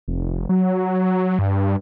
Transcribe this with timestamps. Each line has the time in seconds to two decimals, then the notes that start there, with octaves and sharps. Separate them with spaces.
0.08 F1
0.49 F#3
1.39 G2